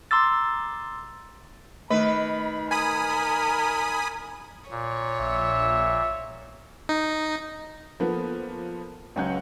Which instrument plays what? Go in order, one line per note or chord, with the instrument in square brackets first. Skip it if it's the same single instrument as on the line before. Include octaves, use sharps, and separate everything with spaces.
[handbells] A#5 C6 D6 E6 A6
[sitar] D#3 B4 [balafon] A3 [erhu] B5
[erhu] A#4 [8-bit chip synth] G#5 B5 D#6
[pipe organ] A#2 [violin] C#5
[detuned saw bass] A#1 [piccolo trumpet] E5
[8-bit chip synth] D#4
[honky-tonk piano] F3 A#3 B3 A4
C#2 F#3 C#4 F#5 G6